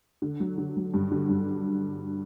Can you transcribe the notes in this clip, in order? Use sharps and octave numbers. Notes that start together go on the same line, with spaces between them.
D3
F#3
D3
F#3
G2
D3
G2